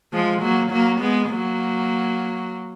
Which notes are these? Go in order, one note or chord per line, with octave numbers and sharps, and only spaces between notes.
F3 G#3
F#3 A#3
F#3 A#3
G#3 B3
F#3 A#3